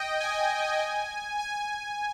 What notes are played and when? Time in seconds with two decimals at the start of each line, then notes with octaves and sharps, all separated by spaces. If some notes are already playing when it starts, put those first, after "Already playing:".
Already playing: D#5 G5
0.20 G#5
1.39 G#5